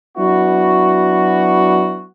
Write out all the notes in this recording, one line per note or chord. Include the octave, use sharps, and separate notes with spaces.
F#3 B3 D4 E4 F#4